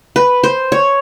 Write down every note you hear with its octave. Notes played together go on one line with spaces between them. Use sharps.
B4
C5
C#5